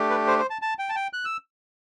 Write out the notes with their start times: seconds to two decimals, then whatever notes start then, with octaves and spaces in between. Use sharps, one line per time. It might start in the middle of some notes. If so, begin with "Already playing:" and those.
Already playing: A3 D4 G4
0.10 B4
0.27 C5
0.39 C5
0.50 A5
0.62 A5
0.79 G5
0.89 A5
0.96 G5
1.13 F#6
1.25 E6